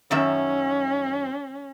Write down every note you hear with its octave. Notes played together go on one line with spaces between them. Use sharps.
F#2 D#3 C#4 E5